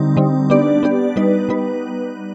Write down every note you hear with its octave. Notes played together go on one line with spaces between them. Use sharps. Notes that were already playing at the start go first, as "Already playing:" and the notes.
Already playing: D3 G3 C4 D#4
D3 G3 C4 D#4
B3 D4 G4 D5
B3 D4 G4 D5
G3 B3 D#4 B4
G3 B3 D#4 B4